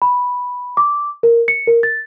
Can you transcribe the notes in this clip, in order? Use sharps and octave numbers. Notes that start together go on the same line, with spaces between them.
B5
D6
A#4
C#7
A#4
A6